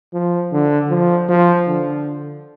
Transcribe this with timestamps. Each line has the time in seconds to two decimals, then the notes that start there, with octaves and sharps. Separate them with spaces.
0.13 F3
0.52 D3
0.90 F3
1.29 F3
1.67 D3